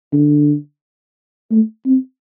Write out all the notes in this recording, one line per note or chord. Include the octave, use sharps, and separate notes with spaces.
D3
A3
C4